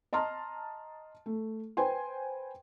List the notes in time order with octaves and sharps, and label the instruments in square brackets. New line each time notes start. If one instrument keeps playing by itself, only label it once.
[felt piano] D#5 A5 A#5 C6 F6
A3
B4 C5 G5 G#5 C6